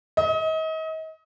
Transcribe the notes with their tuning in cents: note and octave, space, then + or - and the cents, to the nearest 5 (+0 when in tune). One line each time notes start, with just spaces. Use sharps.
D#5 +35